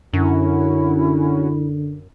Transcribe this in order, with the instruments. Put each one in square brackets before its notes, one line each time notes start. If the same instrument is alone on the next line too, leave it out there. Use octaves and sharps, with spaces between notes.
[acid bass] F#2 [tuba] D3 [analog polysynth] C#4 F#4 [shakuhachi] E4